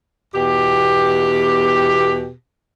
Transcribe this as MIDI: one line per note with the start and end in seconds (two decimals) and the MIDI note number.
0.35 2.31 40
0.35 2.31 47
0.35 2.31 67